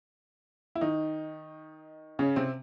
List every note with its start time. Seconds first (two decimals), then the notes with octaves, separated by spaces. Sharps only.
0.75 E4
0.81 D#3 D#4
2.19 C#3 C#4
2.36 C3 C4